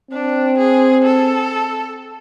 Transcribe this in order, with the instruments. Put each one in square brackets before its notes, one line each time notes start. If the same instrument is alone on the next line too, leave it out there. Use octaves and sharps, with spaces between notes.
[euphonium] C4 [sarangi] D4
[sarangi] G#4
A4